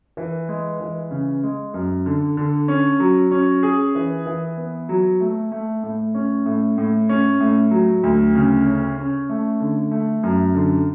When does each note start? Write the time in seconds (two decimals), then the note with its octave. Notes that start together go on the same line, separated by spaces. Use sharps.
0.17 E3
0.49 G#3
0.80 E3
1.11 C#3
1.43 G#3
1.74 F#2
2.06 D3
2.37 D3
2.68 C#4
3.00 F#3
3.31 C#4
3.63 G#4
3.95 E3
4.26 E3
4.57 B3
4.89 F#3
5.20 A3
5.52 A3
5.83 A2
6.15 C#4
6.46 A2
6.78 A2
7.09 C#4
7.40 A2
7.71 F#3
8.03 D2
8.35 C#3
8.66 C#4
8.98 C#4
9.29 A3
9.60 D3
9.91 A3
10.23 F#2
10.54 D3